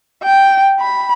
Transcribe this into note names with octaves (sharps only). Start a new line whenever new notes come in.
G5
B5